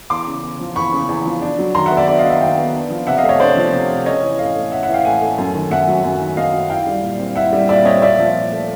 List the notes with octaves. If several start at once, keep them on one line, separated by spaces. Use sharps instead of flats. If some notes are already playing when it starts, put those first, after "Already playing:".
E2 C6 D6
C#3
E2
F3
E2 B5 C#6
C#3
E2
F3
D4
F#3
D#3 A#5 C6
E5 F#5
B3
D5 E5
D4 D5 E5
D#5 F5
F#3
E5 F#5
D#3 F5 G5
B3
D4
F3
C3 E5 F#5
D#5 F5
A3
C#5 D#5
D4 C5 D5
F3
C3
A3
C#4 C#5 D#5
E3
A2 D#5 F5
A3
C#4 E5 F#5
E5 F#5
E3
F5 G5
A2 F#5 G#5
A3
F#2
D#3
F#2 E5 F#5
F#3
F#2
D#3
F#2 D#5 F5
F#3
E4 F5 G5
G3
A#2
C4
E4 E5 F#5
G3
A#2 D5 E5
C4 C#5 D#5
A#2 D5 E5
F3
A#2
A3